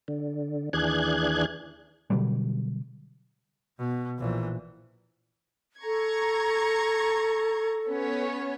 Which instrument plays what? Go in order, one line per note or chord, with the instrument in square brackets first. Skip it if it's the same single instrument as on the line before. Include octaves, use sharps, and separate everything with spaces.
[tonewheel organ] D3
D#2 E3 D4 G#4 F#6 G#6
[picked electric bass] B2 D3 F#3 G3
[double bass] B2
A#1 E3
[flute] A4 [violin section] A#5 C#6 G#6
[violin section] B3 C#4 C#5